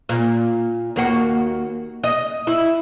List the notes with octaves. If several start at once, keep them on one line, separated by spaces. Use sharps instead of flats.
A#2
D#2 A#3 F#4
D#5
E4